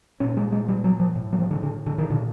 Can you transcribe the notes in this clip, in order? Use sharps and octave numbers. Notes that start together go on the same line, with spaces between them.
A#2 C#4
G#3
G#3
G3
F#3
F3
A2
F#3
F3
D3
D3
D3
D#3
A#2 D3